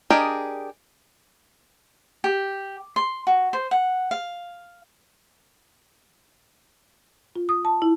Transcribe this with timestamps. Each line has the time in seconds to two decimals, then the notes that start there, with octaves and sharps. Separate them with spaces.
0.10 D4 G4 G#4 A#4 D#5
2.24 G4
2.96 C6
3.27 F#4
3.53 C5
3.71 F#5
4.11 F5
7.36 F4
7.49 D#6
7.65 A5
7.82 E4